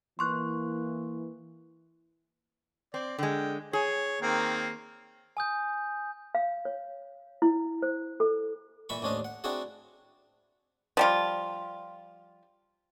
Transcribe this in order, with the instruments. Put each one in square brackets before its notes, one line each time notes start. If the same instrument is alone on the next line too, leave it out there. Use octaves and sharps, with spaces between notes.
[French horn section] E3 A#3 [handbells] C6 C#6 F#6
[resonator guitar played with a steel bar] C4 [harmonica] D5
[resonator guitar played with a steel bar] D3 G#3 [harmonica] G5
[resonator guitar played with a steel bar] G#4 [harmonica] C#5
[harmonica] D#3 A#3 C4
[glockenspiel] G#5 D#6 G6
[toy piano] F5
C#5
E4
C5
A4
[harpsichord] A#2 E3 E5 B5 C#6
A1 D#2 C#4 D4 C5 D#5
F#5
C4 D4 E4 F#4 G#4 F#5
[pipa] F3 G3 F4